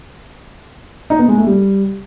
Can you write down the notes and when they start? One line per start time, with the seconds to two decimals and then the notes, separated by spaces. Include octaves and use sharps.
1.10 D#4
1.19 B3
1.28 G#3
1.38 A3
1.47 G3